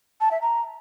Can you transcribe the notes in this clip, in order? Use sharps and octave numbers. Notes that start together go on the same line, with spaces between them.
A5
E5
A#5